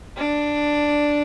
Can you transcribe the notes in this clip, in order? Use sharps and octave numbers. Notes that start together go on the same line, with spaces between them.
D4